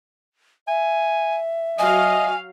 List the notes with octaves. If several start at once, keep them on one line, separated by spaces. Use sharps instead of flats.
E5 G#5
F#3 D#5 F5 G#5